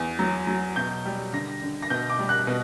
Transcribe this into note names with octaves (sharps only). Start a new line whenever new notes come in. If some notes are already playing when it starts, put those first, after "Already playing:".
Already playing: E2
F#3
F#3
B2 G6
G3
D3 A#6
D3
A#6
B2 G6
D6
G3
F#6
B2